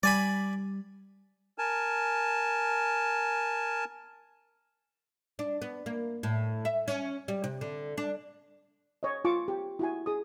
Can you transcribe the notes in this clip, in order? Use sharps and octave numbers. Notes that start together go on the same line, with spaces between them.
G3 D5 G#5 B5
A#4 G#5 A5
D4
B3
A#3
A2
E5
C#4
G3
C3
D3
D4
C#5 D#5
F4 A5 C#6 D6
G4
E4 F#4 G#5
G#4 D#6